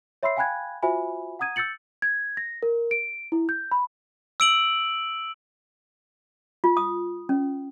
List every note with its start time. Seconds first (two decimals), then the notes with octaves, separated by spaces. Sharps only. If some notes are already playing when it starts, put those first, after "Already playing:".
0.23 C#5 E5 B5 C6 E6 C7
0.37 F5 G5 G#5 B5 F#6 G#6
0.82 F4 F#4 C5 E5 G#5 B5
1.39 F#5 A#5 D#6 G#6 D#7
1.56 E6 G6 A6 C#7 F#7
2.02 G#6
2.37 A#6
2.63 A#4
2.91 D7
3.32 E4
3.49 G6
3.71 B5
4.40 E6 D7 F#7
6.64 F4
6.77 D#6
7.29 C#4